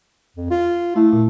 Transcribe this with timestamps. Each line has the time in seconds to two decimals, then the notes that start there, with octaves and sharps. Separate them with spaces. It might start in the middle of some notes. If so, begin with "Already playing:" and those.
0.37 F2
0.51 F4
0.96 A3 E4
1.13 A#2